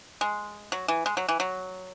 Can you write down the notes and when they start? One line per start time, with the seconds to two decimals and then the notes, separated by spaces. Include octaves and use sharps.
0.21 G#3
0.72 F#3
0.88 E3
1.06 G#3
1.17 F#3
1.28 E3
1.40 F#3